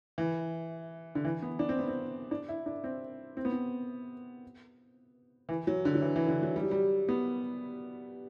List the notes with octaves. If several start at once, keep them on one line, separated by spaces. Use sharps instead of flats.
E3
D3
E3
B3
D4
C4
B3
C4
D4
E4
D4
C4
C4
B3
C4
E3
F#3
D3
F#3
E3
E3
D3
F#3
G3
F#3
G3
B3